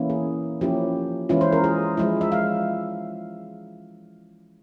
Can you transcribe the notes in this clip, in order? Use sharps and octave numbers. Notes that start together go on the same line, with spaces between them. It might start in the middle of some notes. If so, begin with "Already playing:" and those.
Already playing: E3 A#3 C#4 E4
G#4
F3 A#3 C#4 E4 G4
E3 G#3 C#4 E4 F4
C5
A#4
G#4
F3 G#3 E4
E5
F5